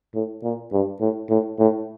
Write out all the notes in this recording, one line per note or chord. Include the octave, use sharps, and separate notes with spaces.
A2
A#2
G2
A2
A2
A2